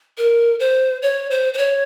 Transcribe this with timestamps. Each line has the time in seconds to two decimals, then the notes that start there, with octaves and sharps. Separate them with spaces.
0.18 A#4
0.60 C5
1.02 C#5
1.31 C5
1.54 C5
1.58 C#5